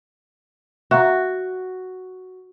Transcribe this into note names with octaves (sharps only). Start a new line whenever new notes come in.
F#4 E5 F5 A#5